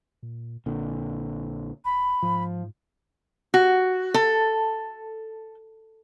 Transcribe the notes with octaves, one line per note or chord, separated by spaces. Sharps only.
A#2
A#1 A#2 D3
E1 B5
G#2 F3
F#4
A4